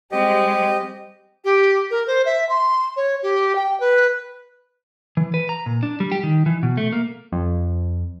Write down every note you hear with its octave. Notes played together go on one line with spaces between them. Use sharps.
G3 G#3 C4 G4 D#5
G4
A#4
C5
E5
C6
C#5
G4
G5
B4
E3
B4
A#5
A#2
D4
G3
G4
D#3
E3
B2
A3
A#3
F2